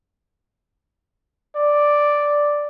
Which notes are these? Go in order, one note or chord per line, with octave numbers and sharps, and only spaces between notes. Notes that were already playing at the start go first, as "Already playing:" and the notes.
D5